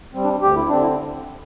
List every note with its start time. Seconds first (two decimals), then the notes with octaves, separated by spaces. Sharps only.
0.13 G3 C4
0.24 D4
0.42 D2 G4
0.56 E4
0.69 D3 C4 D4
0.81 E4